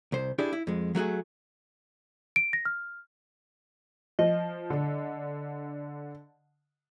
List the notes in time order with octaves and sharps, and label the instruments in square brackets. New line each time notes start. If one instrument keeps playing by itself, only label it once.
[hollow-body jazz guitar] C2 C5
D4 E4 G4 G#4 D5
E4
F2 G#3
F#3 A3 F#4 G#4
[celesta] D7
A#6
F6
[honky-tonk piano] F3 [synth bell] D#5
[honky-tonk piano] D3